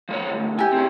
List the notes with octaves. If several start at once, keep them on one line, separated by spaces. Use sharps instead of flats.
F3 G#3 C#5
D2 G#2
E4 G4 G#5
C4 G#4